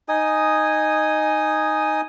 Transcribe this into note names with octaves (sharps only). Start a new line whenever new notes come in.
D#4 D#5 G#5 D#6